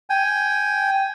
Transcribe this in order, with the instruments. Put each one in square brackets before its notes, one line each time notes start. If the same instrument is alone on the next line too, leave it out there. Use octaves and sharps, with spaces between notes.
[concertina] G5 G#5